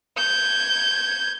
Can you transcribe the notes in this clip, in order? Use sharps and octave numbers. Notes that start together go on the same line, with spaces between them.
G6 G#6